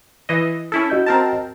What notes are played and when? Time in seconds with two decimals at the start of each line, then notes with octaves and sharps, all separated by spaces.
0.29 E3 D#5
0.72 C#4 E4 A4
0.90 F#4 D#5 G6
1.06 C4 A#4 A5